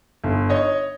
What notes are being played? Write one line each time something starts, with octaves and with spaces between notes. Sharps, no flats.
G1
C#5 D#5